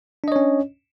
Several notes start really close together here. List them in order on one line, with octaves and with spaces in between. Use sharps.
D4 D#5 C#5 C#4